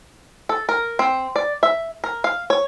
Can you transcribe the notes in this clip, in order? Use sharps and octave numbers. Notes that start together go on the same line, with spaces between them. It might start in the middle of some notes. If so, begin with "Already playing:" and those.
A4
A#4
C4
D5
E5
A#4
F5
C#5